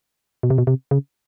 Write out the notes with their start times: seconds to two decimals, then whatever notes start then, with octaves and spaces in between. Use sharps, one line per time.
0.43 B2
0.50 C3
0.58 B2
0.67 C3
0.91 C#3